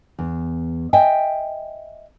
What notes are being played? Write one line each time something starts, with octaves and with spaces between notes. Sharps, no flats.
E2
D#5 E5 G5 G#5